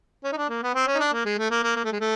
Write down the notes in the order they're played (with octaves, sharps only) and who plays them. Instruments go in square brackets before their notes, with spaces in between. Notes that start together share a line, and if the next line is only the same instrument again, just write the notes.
[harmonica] C#4
D#4
D4
A#3
B3
C4
C#4
D#4
D4
A#3
G#3
A3
A#3
A#3
A#3
A3
G#3
A3